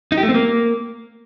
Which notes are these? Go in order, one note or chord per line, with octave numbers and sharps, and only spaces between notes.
D#4
G4
A3
C4
A#3